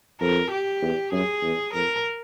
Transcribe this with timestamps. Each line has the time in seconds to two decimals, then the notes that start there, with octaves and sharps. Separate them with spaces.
0.20 F2 A#4
0.51 G4
0.82 E2
1.12 F#2 G#4
1.42 E2
1.73 F2 A#4